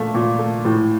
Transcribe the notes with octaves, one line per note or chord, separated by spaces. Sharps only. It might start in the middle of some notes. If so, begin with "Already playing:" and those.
Already playing: A#2 A3 F4
A#2
A3
A2